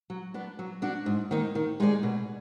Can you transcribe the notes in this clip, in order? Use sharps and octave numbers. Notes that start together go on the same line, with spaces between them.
F#3
B3 D4
F#3
D4 F#4 D5
G#2
D#3 A#3 D#4
D#3
G#3 D#4 G#4 D5
B2